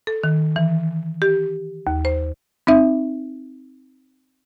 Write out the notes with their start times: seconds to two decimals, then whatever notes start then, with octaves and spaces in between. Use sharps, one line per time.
0.07 A4
0.24 D#3
0.56 E3
1.22 G4
1.87 D#2
2.05 C5
2.67 C4 D#4 E5